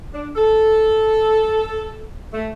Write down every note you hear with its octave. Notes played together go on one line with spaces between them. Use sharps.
D4
A4
A3